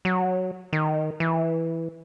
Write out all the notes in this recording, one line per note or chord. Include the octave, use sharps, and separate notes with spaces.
F#3
D#3
E3